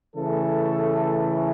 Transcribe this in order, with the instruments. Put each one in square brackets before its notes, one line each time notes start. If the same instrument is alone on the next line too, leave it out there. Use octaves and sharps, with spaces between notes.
[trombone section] C#3 E3 A3 A4